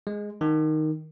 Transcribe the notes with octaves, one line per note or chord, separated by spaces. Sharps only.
G#3
D#3